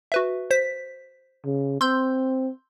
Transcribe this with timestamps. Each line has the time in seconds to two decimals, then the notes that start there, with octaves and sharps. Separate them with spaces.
0.12 F#4 B4 E5
0.51 C5 B6
1.45 C#3
1.81 C4 C6 E6 G6